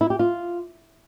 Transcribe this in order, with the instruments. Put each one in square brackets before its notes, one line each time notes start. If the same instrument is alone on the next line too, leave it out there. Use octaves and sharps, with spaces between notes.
[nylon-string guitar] E4
G4
F4